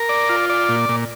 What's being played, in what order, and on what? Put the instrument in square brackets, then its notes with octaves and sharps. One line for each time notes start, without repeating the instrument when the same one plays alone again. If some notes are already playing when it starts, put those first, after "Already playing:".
Already playing: [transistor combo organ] A#4
D5
F4
D5
A#2
A#2